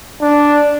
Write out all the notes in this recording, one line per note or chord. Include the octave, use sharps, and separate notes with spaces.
D4